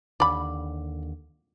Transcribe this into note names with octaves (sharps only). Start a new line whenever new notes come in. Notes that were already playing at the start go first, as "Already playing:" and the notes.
D#2 D3 D5 B5 D6